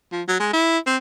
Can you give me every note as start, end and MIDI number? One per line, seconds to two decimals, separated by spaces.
0.12 0.22 53
0.28 0.35 54
0.40 0.49 56
0.53 0.78 64
0.86 0.96 60